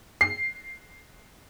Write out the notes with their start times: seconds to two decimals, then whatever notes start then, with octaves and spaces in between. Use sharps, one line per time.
0.21 C7